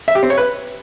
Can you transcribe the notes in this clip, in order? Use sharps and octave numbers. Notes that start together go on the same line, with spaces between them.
E5
G4
C4
C#5
B4